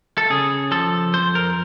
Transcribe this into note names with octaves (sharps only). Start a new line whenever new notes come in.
A4
C#3 G#4
F3 A4
F2 C5
A#4